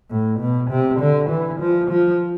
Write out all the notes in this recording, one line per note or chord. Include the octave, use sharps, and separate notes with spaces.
A2
B2
C3
D3
E3
F3
F3